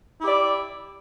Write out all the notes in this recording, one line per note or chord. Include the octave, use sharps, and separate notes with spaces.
E4 G4 D5